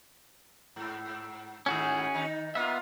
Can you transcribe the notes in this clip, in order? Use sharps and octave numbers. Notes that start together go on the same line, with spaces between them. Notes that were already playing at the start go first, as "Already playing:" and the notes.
G#2
G#2 D#3 C#4 F#4 G#4
D#3 D#4
A#3 B3 F4 E5